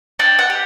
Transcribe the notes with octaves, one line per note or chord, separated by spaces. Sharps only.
D4 G5
F#5
G4